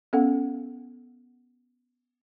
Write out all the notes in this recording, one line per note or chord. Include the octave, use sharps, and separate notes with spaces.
B3 C#4 A4 F#5